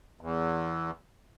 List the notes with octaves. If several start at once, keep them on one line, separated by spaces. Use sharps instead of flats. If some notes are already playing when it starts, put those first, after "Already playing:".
E2